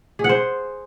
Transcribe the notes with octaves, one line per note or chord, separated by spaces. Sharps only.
G#4
F#5
C5